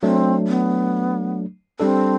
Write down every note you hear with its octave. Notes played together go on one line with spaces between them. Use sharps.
F#3 A3 C4 D4
B3
G3 C4 D4 A4